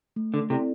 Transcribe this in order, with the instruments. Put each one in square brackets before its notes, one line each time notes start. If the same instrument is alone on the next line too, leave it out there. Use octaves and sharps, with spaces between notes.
[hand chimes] A3
[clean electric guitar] D3
[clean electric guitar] C3 [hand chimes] C4 E4 A4 D5